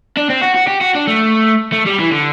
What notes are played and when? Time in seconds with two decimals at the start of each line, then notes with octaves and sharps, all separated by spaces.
0.17 D4
0.30 C4
0.42 F#4
0.55 F#4
0.68 G4
0.81 F#4
0.95 D4
1.07 A3
1.73 A3
1.86 G3
2.00 E3
2.12 D3